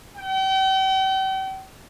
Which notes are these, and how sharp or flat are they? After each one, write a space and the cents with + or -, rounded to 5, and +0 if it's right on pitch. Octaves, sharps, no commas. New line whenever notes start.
G5 -40